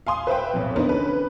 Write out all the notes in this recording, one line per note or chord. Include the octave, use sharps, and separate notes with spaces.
F5 G#5 C6 D#6
B4 C5 E5 F5 G5
B1 F2
B3 D4 D#4 A#4 C5
D3 C#4 B4